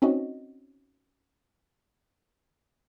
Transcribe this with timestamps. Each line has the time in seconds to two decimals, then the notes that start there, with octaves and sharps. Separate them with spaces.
0.02 C4 C#4 D#4 F#4 D#5